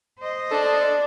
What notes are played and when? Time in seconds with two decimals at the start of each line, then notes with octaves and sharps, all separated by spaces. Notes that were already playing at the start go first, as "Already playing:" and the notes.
0.19 C5 D#5
0.51 D4 A4